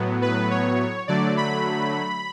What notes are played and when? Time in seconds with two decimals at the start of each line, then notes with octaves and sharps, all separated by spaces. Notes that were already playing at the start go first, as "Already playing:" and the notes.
Already playing: A2 F#3 B3
0.22 B4
0.50 C#5
1.08 D3 F#3 A3 D5
1.37 B5